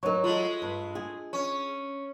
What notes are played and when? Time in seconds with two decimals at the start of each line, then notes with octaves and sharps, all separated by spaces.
0.03 F#3 D#4 A#4 C5 C#6
0.24 G#3 A3 F4 D#5
0.62 G2
0.95 G#4
1.33 C#4 C#6